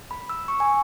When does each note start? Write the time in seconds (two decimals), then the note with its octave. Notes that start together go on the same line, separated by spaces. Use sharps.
0.11 B5
0.29 E6
0.48 C#6
0.60 G#5